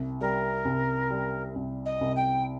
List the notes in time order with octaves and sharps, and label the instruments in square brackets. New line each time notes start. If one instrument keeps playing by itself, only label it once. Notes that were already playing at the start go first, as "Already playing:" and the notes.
Already playing: [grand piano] C2
[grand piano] G3 [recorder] A#4
[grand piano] C2
G3
C2
[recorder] D#5
[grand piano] C2
[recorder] G5